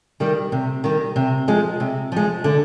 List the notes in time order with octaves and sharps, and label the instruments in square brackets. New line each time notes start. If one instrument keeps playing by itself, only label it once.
[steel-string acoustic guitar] D#3 G3
C3
D#3 G3
C3
F3 G#3
C3
F3 G#3
D3